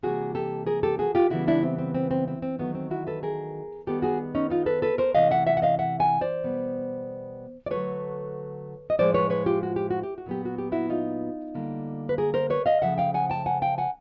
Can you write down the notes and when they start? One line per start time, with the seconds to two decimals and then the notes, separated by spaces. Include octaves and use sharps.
0.03 C3 E3 G3 A#3 F#4 G#4
0.35 G4 A4
0.67 G#4 A#4
0.83 G4 A4
0.99 F#4 G#4
1.15 F4 G4
1.30 C#3 E3 G3 B3 E4 F#4
1.48 D4 E4
1.63 C4
1.78 C4
1.95 C4
2.11 C4
2.28 C4
2.42 C4
2.59 D#3 F#3 A3 B3
2.75 C4
2.91 E4 F#4
3.07 A4 B4
3.23 G#4 A#4
3.87 D#3 G3 B3 G4 A4
4.02 F#4 G#4
4.35 C#4 D#4
4.50 D#4 F4
4.66 A4 B4
4.82 A4 B4
4.98 A#4 C5
5.15 C3 E3 A3 D#5 F5
5.31 E5 F#5
5.47 E5 F#5
5.57 F#5
5.62 D#5 F5
5.79 E5 F#5
6.00 F#5 G#5
6.21 C5 D5
6.43 B2 G3 B3
7.66 D5
7.71 D3 F#3 A3 B4 C#5
8.90 D#5
8.98 A2 F3 G#3 C5 D5
9.14 B4 C#5
9.30 B4 C#5
9.46 F4 G4
9.63 F#4
9.76 G4
9.91 F#4
10.03 G4
10.18 F#4
10.26 A#2 F#3 B3 G4
10.45 F#4
10.58 G4
10.72 E4 F#4
10.90 D#4 F4
11.55 D3 G3 A#3
12.09 B4
12.18 G#4 A#4
12.34 A#4 C5
12.50 B4 C#5
12.66 D#5 F5
12.82 C#3 F3 A3 E5 F#5
12.98 F5 G5
13.14 F#5 G#5
13.30 G5 A5
13.46 F#5 G#5
13.62 F5 G5
13.78 F#5 G#5